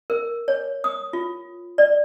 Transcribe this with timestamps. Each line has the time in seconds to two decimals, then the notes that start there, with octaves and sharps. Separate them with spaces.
0.10 A#4
0.48 C#5
0.84 D#6
1.13 F4
1.78 D5